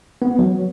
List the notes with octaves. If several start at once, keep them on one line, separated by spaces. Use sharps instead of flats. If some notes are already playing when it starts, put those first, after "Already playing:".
B3
F#3